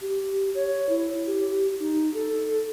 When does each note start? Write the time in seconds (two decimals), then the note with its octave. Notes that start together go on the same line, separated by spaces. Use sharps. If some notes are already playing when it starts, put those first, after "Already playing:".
0.01 G4
0.55 C#5
0.89 E4
1.27 G4
1.80 D#4
2.14 A4